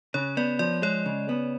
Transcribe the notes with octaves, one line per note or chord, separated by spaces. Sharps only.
C#3 C#5
B3 D5
F3 D5
G#3 C#5
C#3
B3